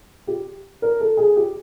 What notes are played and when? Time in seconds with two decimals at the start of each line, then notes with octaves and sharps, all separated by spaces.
0.27 G4
0.82 A#4
1.00 A4
1.17 G#4
1.36 G4